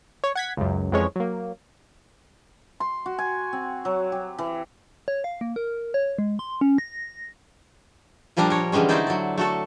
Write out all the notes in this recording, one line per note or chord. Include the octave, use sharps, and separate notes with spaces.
C#5
F#5 G#6 B6
C#2 F#2
F2 E3 G#3 C#4 C#5
F#3 A#3
C6
F#4
G#5
C4
F#3
G4
E3
C#5
F5
A#3
A#4
C#5
G#3
C6
C#4
A#6
A#2 F3 G3 D4 A#4
A#4 C#5
D3 E3 G3 G#3 C#4
D3 A3 D#4 E4 C5 D5
F#3 D5
A3 F#4 A4